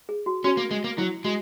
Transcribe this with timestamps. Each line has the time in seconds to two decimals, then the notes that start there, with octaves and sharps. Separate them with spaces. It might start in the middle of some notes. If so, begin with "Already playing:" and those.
0.09 G#4
0.26 F#4
0.44 C#4 F#4
0.57 A#3
0.71 G#3
0.84 A#3
0.98 F#3 E4
1.24 G#3 F#4